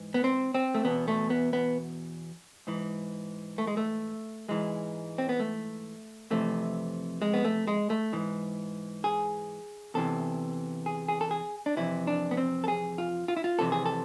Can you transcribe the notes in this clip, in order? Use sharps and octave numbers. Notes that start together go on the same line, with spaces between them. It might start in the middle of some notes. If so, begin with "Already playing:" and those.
Already playing: G#2 E3
B3
C4
C4
A3
E2 B2 B3
A3
B3
B3
G#2 E3
A3
G#3
A3
G#2 E3 G#3
C4
B3
A3
F2 C3 E3 A3
G#3
B3
A3
G#3
A3
G#2 E3
G#4
E2 C3 E3 A4
G#4
G#4
A4
G#4
D4
F2 C3 E3 E4
D4
B3
C4
A4
G#4
F4
F4
E4
F4
F2 C3 E3 A4
G#4
A4